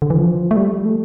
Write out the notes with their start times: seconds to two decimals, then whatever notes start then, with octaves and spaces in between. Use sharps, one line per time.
0.02 D3
0.10 E3
0.17 F3
0.51 A3
0.56 G3
0.85 A3